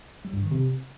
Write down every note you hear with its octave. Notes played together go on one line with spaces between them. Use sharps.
G3
G2
D#3
C3